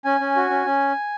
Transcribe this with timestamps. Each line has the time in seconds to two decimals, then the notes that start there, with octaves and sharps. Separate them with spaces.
0.04 C#4 G#5
0.20 C#4
0.36 F#4
0.50 C#4
0.66 C#4